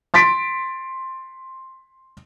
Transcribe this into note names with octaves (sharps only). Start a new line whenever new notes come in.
C6 A6 B6 D7